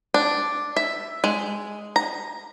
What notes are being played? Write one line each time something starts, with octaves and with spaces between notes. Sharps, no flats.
D4
E5
G#3
A#5